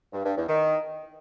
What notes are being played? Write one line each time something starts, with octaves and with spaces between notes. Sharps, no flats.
G2
G2
E2
D#3